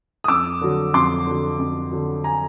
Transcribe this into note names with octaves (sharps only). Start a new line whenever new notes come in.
D#6
F2 D6 E6
D3 F#3
F2 C6 D6
D3 F#3
F2
D3 F#3
G#5 A#5